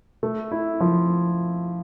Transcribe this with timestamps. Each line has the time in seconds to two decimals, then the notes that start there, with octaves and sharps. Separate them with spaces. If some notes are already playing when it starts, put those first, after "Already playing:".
0.23 A3
0.52 E4
0.80 F3